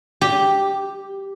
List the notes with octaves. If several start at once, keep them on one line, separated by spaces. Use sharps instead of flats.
G4